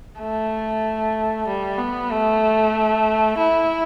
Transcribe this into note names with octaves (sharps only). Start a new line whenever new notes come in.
A3
G3
B3
A3
E4